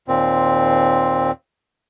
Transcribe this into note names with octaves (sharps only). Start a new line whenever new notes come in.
D#2 A#2 C4